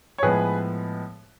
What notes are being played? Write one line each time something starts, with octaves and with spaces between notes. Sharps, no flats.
C#5
A2 F3 G#3 B3 G#4 B4